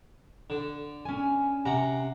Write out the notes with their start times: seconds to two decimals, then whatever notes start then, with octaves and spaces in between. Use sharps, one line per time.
0.50 D3
1.05 C#4 G#5
1.65 C3 F#5 A#5